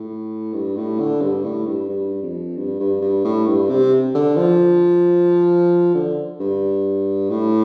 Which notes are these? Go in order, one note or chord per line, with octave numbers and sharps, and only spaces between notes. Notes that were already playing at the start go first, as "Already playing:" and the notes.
Already playing: A2
G2
A2
D3
G2
A2
G2
G2
F2
G2
G2
G2
A2
G2
C3
D3
F3
D3
G2
A2